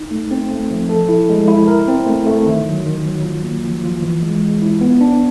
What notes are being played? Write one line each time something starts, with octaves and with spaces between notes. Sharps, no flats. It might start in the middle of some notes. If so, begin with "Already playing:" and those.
Already playing: D#4
A3
C4
A3
F3
A4
E4
G#3
E4
A#4
C4
A3
A3
D#3
F#3
D#3
F#3
F4
A#3
F3
F4
E3
G#3
G#3
E4
B3
D4